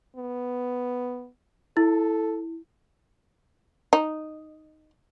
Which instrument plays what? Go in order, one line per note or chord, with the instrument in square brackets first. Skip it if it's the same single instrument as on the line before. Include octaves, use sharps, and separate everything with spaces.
[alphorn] B3
[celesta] E4 [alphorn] A4
[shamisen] D#4